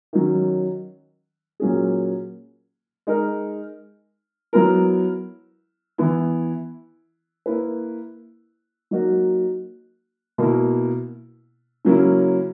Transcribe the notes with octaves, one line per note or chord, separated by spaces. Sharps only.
D#3 F#3 C#4
A#2 F#3 A#3 C#4 G#4
G#3 D#4 A#4
F#3 B3 E4 A#4
E3 B3 E4
A#3 E4 B4
F#3 A#3 D#4 F#4
B2 A#3 E4
C#3 F#3 A#3 C#4 E4